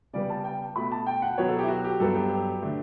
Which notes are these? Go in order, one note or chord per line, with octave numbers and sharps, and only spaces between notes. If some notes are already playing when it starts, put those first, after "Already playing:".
C#3 G3 B3 D5
A5
G5
B2 A3 B5
A5
G5
F#5
B2 F#3 B3 C#5
A4
G4
E4
F#4
G4
G2 F#3 B3 A4
G4
D3 A3